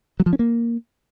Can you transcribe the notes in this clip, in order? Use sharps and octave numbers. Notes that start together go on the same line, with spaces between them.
F#3
F3
C#4
A#3